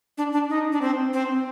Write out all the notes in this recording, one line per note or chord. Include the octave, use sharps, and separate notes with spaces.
D4
D4
D#4
D4
C4
C4